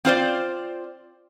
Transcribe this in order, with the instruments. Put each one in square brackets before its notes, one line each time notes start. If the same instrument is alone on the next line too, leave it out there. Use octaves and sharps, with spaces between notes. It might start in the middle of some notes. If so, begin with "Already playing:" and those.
[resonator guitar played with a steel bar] C4 F4 C5 D5